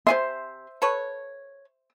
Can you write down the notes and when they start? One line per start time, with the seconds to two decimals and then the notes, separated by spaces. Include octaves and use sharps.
0.07 C3 C5 E5 G#5 C6
0.82 A4 B4 C#5